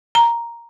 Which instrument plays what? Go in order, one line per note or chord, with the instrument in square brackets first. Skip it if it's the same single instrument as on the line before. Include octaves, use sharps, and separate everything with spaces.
[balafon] A#5